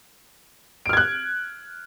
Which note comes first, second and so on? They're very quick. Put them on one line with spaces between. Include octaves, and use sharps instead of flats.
D7 F6 G#6 F#6